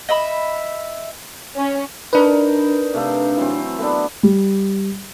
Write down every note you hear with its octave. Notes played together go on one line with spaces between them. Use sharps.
D#5 E5 B5
C#4
D4 D#4 A#4 B4
C3 A3 F5
E3 F#3 C4
A3 B3 D4
G3